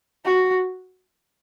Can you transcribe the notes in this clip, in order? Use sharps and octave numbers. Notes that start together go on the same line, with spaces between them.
F#4